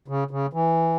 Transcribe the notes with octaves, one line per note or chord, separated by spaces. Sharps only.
C#3
C#3
E3